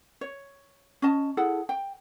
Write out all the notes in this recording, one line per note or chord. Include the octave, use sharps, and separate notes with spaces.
C#5
C#4 D#5 A5
E4 G#4 A4 F#5
G5